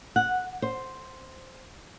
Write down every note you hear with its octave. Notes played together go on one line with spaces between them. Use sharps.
F#5
C5